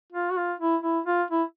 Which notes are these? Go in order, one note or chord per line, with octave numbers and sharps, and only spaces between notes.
F4
F#4
F4
E4
E4
F4
E4